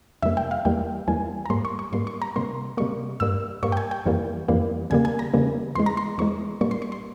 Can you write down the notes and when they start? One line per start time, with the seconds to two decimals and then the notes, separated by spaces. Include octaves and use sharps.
0.23 F2 C3 G3 A#3 E5
0.37 G5
0.51 F5
0.65 E2 E3 G3 A#3 G5
1.08 E2 E3 G3 A#3 G#5
1.46 A#5
1.50 G#2 G3 A#3 C6
1.65 C#6
1.79 C#6
1.93 G#2 G3 A#3 C6
2.07 C#6
2.22 A#5
2.36 C3 G3 A#3 C6
2.77 C3 G3 A#3 C#6
3.20 G2 G3 A#3 E6
3.63 G2 G3 A#3 C#6
3.72 G5
3.77 G#5
3.91 G5
4.06 F2 E3 G3 A#3
4.48 F2 E3 G3 A#3
4.90 E2 C#3 G3 A#3 G#5
5.05 G#5
5.19 A#5
5.34 E2 C#3 G3 A#3
5.75 E2 E3 G#3 C6
5.86 A#5
5.97 C6
6.18 E2 E3 G#3 C#6
6.61 A#2 G3 A#3 C#6
6.71 C6
6.82 C#6
6.92 C6